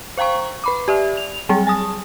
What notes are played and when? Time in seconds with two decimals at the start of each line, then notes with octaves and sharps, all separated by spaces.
0.17 C5 F5 G5 A#5 C#6
0.64 B4 B5 D6
0.88 G4 D5 E5
1.17 F7
1.49 F#3 G3 C4 G#4
1.67 G#5 A5 D#6